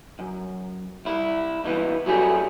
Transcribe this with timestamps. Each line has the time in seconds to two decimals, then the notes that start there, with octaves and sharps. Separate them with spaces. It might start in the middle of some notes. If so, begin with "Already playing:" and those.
0.19 F#2
1.05 C2 E4
1.64 C#2 E3 B3
2.06 F#3 G3 A3 C#4 F#4 G#4